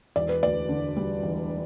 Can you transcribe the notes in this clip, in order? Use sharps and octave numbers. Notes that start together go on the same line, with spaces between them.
E1 D5
B4
D2 D5
D3
G3
E1